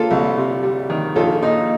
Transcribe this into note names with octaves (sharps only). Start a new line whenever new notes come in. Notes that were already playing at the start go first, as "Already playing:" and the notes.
Already playing: A#3 F4 A4
C2
C3
G3
D#3
A#1 F4 A4
A#2 D#4